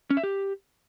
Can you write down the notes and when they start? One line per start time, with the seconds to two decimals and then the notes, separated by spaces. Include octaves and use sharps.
0.10 C#4
0.17 E5
0.23 G4